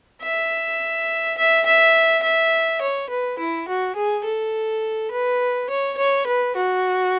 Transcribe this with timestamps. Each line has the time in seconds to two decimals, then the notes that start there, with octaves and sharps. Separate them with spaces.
0.22 E5
1.37 E5
1.66 E5
2.23 E5
2.81 C#5
3.09 B4
3.39 E4
3.68 F#4
3.95 G#4
4.24 A4
5.11 B4
5.69 C#5
5.97 C#5
6.26 B4
6.56 F#4